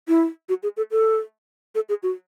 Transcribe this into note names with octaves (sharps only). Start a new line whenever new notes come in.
E4
F#4
G#4
A4
A4
A4
G#4
F#4